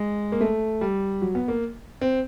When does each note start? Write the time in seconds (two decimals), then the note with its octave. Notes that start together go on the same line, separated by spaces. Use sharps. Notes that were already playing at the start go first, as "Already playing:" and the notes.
Already playing: G#3
0.32 A#3
0.41 A3
0.81 G3
1.22 F#3
1.35 B3
1.48 A#3
2.01 C4